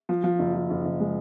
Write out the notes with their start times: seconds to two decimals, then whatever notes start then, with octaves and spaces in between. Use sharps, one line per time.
0.09 F3
0.24 F3
0.39 F#1
0.54 F3
0.70 F#1
0.85 F#1
1.00 G#3